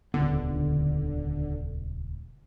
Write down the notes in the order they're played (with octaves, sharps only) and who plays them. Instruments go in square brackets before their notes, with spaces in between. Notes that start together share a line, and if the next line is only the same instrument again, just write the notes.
[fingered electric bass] D#1 C#2 B3 [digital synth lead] D3